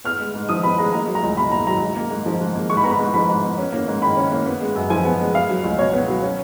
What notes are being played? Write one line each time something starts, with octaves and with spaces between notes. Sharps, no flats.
B3 F6
G#3
G#2
F3 D#6
B3 B5
G#3 A#5
A#3 A#5
F#3
A#5
C#2
B2 B5
A#3 A#5
F#3 A#5
G#2
A#3
G#2
F3
G#2
A#3
G#2 C#6
B5
B3 A#5
B5
G#2
F3 B5
G#2
B3
C#4
A#3
G#2
D#3 B5
C#4
A#3
B3
G#3
F#2
F3 G#5
B3
G#3
B3 F5
F#3
C#2
B2 C#5
B3
F#3
C#4